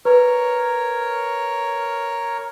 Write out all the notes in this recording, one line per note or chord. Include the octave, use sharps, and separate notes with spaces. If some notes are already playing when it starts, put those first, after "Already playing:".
A#4 B4 C#5